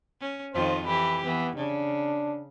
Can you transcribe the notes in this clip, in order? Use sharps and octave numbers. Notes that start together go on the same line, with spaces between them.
C#4
F2 D#3 F4 C5
E3 G4 B5
E3 B3
C#3 D4